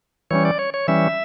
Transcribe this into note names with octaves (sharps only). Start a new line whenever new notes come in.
E3 G3 C#4 C#5
D5
C#5
C#5
E3 G3 C#4 E5